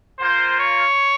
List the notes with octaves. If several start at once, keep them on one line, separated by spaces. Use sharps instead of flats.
A#3 F4 C5
C#5